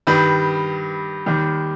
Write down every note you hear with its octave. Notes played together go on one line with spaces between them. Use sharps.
G2 D#3 G3 B4
D#2 D#3 G3